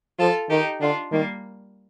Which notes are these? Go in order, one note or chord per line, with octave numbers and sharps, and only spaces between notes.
F3 F4 A4
D#3 D#4 G4
D3 D4 F4
D#3 G3 A#3